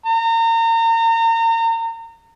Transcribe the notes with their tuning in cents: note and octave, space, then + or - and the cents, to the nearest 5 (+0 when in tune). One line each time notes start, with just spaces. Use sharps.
A#5 -35